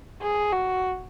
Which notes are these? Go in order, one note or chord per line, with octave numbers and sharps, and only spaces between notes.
G#4
F#4